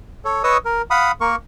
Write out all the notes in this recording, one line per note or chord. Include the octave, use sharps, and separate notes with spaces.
A4 C#5
B4 C#5 D#5 C#6 D#6 E6
A#4
F5 F#5 B5 D#6
A#3 A#4 C#6